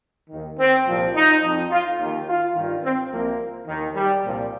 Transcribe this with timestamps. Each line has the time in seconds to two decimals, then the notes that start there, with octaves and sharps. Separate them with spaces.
0.30 D#2 D#3
0.59 C4
0.87 C2 A#2 F3
1.15 D#4
1.43 F2 F3
1.71 F4
1.99 D#2 D#3
2.27 F4
2.55 G2 D#3
2.84 C4
3.11 C2 C3 F3 A#3
3.67 D#2 D#3
3.96 G3
4.24 C2 A#2 F3